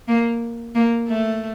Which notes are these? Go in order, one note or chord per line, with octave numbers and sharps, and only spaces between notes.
A#3
A#3
A3